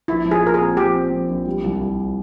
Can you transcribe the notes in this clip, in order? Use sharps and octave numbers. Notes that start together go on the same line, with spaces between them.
A#1 E4
F3
G#4
A#2 A#4
G#4
C4
F3 G4
C4
F3
A#1
G3
C2
C2